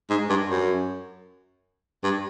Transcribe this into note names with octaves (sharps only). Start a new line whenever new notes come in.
G#2
G2
F#2
G2